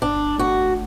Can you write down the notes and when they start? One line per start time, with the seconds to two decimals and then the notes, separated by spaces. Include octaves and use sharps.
0.02 G1 D4
0.38 A3 F#4